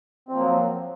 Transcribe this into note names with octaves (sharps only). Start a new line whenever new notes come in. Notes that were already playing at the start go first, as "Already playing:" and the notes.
F3 F#3 A#3 C4